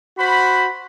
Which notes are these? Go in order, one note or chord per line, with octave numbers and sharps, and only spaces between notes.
F#4 C5 B5